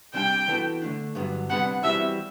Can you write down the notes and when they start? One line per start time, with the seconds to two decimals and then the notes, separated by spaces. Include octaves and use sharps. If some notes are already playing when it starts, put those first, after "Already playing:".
0.14 C3 G3 D4 G5
0.48 E3 B3 F#4 A4
0.82 D3 A3 D4
1.15 G2 D3 F#3 B3
1.49 C3 G3 B3 D4 F#5
1.83 E3 G3 C4 F#4 E5